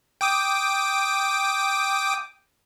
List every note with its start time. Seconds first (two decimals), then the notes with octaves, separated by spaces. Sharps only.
0.21 G5 D6 D#6